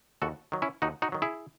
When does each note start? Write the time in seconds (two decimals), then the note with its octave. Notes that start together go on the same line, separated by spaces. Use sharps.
0.22 D#2 F#4 A4
0.52 D#3 F#3
0.62 C#4 E4
0.82 D#2 D#4 F#4
1.02 D#4 F#4
1.12 D#3 F#3
1.22 E4 G#4